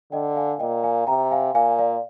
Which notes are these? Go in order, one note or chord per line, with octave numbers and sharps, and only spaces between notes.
D3 D#5 G5
F5 G#5
A#2 D#5 G5
F5 G#5
C3 G5 A#5
F5 G#5
A#2 F5 G#5
D5 F5